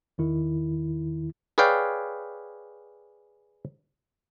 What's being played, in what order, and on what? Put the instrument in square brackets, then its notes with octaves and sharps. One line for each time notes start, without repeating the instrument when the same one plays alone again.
[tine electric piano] E2 D#3 E4
[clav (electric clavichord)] G#4 B4 C#5 D5 F5 G5